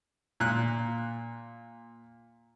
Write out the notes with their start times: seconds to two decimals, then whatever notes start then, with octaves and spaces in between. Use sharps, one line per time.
0.40 A#2 F#6